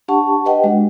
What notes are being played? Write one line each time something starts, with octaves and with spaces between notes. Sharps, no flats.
D4 G4 F#5 A5 C#6
G4 B4 D#5 F#5 G5
G#3 D4 F#4